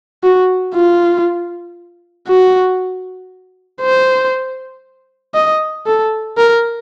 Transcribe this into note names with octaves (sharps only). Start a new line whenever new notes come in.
F#4
F4
F#4
C5
D#5
A4
A#4